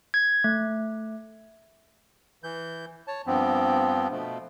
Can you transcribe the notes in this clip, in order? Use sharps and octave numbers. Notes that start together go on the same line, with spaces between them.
G#6
A3
E3 G6
C#5 A5
G2 F3 B3 C4
B2 F3 A3